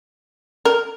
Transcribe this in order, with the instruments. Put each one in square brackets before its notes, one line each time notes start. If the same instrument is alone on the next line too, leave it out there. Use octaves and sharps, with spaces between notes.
[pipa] A#4